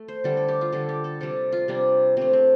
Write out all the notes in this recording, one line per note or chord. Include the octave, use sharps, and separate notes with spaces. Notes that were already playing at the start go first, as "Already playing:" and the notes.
Already playing: A3
C5
D3 G3 A4
A4
G4
F4
D3 G3 A4
G4
A4
C3 G3 A4
F4
C3 G3 D4
C3 A3 C4
C4